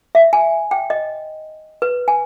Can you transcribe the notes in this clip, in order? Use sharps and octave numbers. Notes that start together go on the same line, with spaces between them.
E5
G#5
G5
D#5
B4
G#5